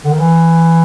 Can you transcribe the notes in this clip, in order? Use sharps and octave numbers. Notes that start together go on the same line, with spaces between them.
D3
D#3
E3